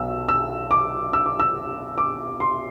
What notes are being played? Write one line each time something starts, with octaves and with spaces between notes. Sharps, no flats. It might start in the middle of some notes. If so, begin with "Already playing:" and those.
Already playing: B1 B2 E6
E6
D6
E6
D6
E6
D6
C6